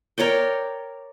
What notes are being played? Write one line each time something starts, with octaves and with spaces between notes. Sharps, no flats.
A#4 C#5 D5 G5